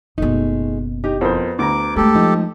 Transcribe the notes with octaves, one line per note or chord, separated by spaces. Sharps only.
F#1 B2 G#3 A3 D#4
D#4 G4
F2 B3 A#4 C5
D2 A#5 D6
G#3 A3 G4 A4
F3 D#4